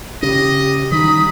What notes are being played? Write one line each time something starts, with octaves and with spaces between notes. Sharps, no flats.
C#3 C#4 G4 D#5
D#3 E3 G3 D#4 B5 D#6